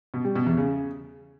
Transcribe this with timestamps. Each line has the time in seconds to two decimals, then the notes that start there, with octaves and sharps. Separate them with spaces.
0.14 B2
0.25 G3
0.36 B2
0.46 E2
0.57 C#3